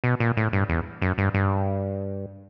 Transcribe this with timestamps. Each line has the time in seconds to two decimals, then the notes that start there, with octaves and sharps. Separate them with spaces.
0.04 B2
0.20 A#2
0.37 A2
0.53 G2
0.69 E2
1.02 F#2
1.18 G2
1.34 G2